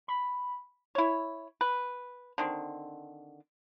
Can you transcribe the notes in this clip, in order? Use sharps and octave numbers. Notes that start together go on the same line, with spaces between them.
B5
E4 C#5
B4
D3 D#3 C4